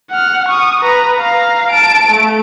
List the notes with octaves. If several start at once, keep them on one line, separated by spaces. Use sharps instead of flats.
F#5 F6
C#6 D#6
B4 A#5
F5 A#5
A5 D7
A3